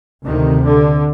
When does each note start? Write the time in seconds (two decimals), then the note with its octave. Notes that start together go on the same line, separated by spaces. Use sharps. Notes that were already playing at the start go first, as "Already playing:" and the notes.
0.23 D2 C3 D#3
0.65 D3